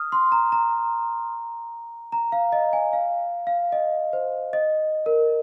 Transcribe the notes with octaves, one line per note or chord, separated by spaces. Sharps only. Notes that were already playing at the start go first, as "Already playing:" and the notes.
Already playing: D#6 F6
C6
A#5
A#5
A#5
F5
D#5
G#5
F5
F5
D#5
C5
D#5
A#4